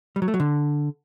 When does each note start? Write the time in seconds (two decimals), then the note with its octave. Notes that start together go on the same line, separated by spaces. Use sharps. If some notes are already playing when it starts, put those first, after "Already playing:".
0.16 G3
0.22 F#3
0.28 A3
0.34 F#3
0.40 D3